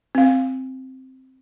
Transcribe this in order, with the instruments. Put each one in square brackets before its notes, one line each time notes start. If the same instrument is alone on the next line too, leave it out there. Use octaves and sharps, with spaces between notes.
[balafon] C4 F5